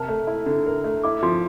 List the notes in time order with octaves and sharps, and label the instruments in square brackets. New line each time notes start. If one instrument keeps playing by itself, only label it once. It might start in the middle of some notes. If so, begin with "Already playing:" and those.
Already playing: [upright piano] C3 A#4 [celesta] A5
[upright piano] A3
E4
D3
A#4
A3
[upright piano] E4 [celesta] D6
[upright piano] F3 [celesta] C6